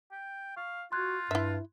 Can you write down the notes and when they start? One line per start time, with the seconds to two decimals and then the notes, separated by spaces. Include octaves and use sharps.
0.12 G5
0.56 F5 C#6
0.92 F4 F#4 C6 F#6 G#6
1.31 G2 E4 E5